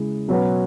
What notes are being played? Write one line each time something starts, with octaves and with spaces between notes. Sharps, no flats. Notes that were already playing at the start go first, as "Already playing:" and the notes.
Already playing: C#3 G#3 E4
B2 F#3 C#4 F#4 B4